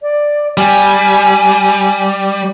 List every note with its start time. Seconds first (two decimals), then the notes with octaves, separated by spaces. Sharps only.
0.02 D5
0.57 G3 G#5